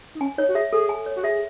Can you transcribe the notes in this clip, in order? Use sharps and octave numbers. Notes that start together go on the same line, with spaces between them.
D#4
C#4 G#5
D#4 C#5
F#4
G#4 E5
G#4 A4
G#5
C#5
F#4
G#4 E5